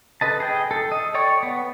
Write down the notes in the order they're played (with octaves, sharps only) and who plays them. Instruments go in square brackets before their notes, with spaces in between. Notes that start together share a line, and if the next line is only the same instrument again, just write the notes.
[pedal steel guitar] A4 B4 D#5 A5
G#4 G5
A4
D#5
C#5 D5 G5 C#6
B3